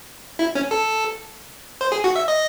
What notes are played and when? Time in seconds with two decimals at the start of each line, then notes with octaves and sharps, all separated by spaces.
0.39 E4
0.55 C#4
0.71 A4
1.81 C5
1.92 G#4
2.04 F#4
2.16 E5
2.28 D#5